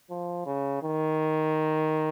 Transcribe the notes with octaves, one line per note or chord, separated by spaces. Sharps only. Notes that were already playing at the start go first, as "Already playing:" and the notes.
F3
C#3
D#3